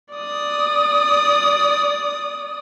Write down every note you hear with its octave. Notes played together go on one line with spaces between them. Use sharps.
D5 D#6